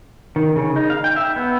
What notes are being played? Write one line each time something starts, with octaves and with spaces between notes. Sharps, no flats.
D#3
C#3
D#4
F5
G5
E5
B3